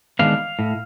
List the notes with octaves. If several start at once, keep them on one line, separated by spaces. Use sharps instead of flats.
D#3 G#3 B3 D4 F5
A2